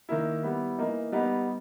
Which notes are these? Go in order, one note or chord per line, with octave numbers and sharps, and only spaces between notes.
D#3 A#3 E4
G3 B3 E4
E3 A#3 D#4
G3 B3 D#4